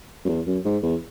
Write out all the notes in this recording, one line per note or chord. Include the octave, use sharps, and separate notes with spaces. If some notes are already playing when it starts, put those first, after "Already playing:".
F#2
E2
F#2
G#2
E2